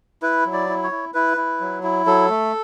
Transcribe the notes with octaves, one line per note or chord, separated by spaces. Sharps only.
E4 B4
F#3
D5
E4
C#5
E4
E4 B4
E4
F#3
E4
F#3 A4
A3